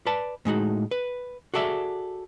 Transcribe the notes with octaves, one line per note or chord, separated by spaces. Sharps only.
B4 D5 A5
A2 G#3 D#4 F#4
B4
F#4 G#4 A4 D5 E5